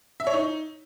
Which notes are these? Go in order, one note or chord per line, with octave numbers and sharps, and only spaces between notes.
E5
C#5
D#4